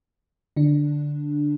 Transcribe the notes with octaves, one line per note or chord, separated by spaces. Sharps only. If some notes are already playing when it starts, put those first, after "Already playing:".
D3 D4